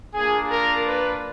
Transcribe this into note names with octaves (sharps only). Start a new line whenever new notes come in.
A#3 D4 F4 G#4
A#4
B4